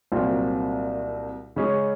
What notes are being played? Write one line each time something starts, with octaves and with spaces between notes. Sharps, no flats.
C2 A#2 F#3 C4 F4
C#3 G#3 C#4 G#4